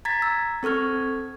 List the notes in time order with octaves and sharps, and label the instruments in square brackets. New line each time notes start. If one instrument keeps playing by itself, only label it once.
[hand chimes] A#5 G#6 A6 B6
E6
C4 A4 C#6 F6 G#6